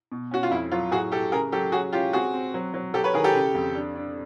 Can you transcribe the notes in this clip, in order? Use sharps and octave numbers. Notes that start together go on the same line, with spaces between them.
B2
C#4 F#4
F4
F2 E4
F#3 F4
A2 F#4 G#4
A2 G4 A4
C#3 G#4 A#4
F#3 G4 A4
C#4 F#4 G#4
C#4 F4 G4
C4 F#4 G#4
C4
F#3
F#3
F#3 G4 A4
B4 C#5
D#3 G#4 A#4
G4 A4
C#3
F2
D4
D4